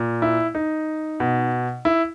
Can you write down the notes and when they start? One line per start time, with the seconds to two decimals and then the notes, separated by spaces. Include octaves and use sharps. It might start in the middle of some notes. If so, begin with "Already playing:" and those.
Already playing: A#2
0.22 E4
0.55 D#4
1.20 B2
1.85 E4